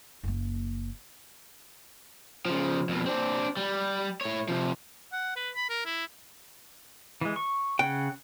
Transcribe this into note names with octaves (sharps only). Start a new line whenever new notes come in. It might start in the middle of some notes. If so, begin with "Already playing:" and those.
F#1 A#3
C#3 F3
F2 B2
C4 D4
G3
A2 C#5
C3 F3
F#5
B4
B5
A#4
E4
E3 G#3
C#6
C#3 F#5 G5